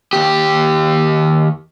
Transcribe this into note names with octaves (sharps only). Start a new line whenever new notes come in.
D#2 G4